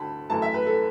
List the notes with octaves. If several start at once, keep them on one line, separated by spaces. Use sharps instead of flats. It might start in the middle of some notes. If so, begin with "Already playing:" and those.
Already playing: D2 D3 A3 A5 B5
F#2 E3 A3 A5
E5
B4
A4